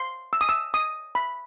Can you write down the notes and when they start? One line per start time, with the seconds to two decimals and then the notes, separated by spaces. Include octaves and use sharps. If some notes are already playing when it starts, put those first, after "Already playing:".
Already playing: C6
0.33 E6
0.41 D#6
0.49 E6
0.74 D#6
1.15 B5